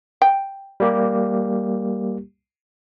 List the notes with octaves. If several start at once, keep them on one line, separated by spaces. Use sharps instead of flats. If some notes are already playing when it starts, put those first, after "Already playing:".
G5
G3 A#3 G4